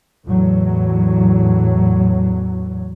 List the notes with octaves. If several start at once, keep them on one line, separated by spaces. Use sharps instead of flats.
E2 A2 F#3